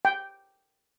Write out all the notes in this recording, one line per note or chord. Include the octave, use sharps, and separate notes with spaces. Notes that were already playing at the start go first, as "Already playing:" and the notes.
G5